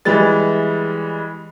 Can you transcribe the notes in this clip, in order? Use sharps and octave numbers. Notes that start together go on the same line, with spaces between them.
E3 G3 G#3 A6